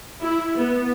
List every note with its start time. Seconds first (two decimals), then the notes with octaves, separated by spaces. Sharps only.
0.21 E4
0.56 B3